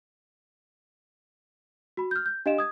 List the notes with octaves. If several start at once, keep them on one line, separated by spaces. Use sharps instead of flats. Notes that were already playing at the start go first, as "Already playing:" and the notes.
F#4 B5
F6 G6
G6
D4 G4 D#5 F5 D7 E7
D#6 G#6